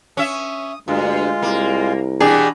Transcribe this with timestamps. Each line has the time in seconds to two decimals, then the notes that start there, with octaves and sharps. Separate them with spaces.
0.17 C#4 E5 D#6
0.88 D2 G2 G#3 F4
1.42 C2 A#3
2.20 B2 E3 D4 G4 G#4 D5